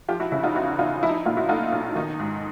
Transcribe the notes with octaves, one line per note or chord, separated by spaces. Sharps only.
F3 F4 G4
E4 F#4
C#3 E4
D#4 F4
E2 E4 F#4
E2 D#4 F4
F3 E4
D#4
E4
A#2 D#4 F4
E4 F#4
A3 D#4 F4
B1
D#3 D#4
G#2